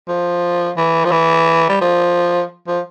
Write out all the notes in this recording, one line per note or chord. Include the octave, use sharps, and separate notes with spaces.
F3
E3
F3
E3
G3
F3
F3